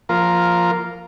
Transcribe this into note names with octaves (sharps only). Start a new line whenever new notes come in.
F3 A#3 F4 A#4